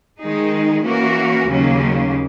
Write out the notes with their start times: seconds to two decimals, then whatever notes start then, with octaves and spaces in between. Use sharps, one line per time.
0.18 D#3 G#3 D#4 G#4
0.83 E3 A#3 C#4 F#4 A#4
1.47 D#2 C#3 F#3 A#3 C#4